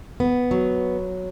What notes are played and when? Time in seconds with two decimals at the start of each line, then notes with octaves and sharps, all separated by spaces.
0.20 B3
0.51 F#3